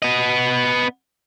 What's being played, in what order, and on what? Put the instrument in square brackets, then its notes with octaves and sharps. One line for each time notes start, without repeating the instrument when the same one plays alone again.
[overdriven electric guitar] B3 D#5